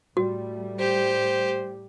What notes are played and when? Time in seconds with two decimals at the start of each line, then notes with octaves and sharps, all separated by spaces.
0.17 A2 G3 A3 F#4
0.79 G4 C5